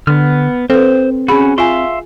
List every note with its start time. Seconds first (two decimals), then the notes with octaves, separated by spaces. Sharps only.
0.07 D3 B3 F6
0.70 C4 A4 B4 C5
1.28 C#4 F#4 G#4 B5
1.58 F4 E5 F5 G#5 C6